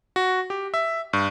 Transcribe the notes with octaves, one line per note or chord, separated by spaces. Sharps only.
F#4
G4
E5
G2